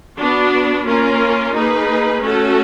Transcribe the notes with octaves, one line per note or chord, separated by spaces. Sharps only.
B3 D4 F#4
A#3 C#4 F4 A#4
A#3 D#4 G#4 B4
A3 C#4 F#4 A4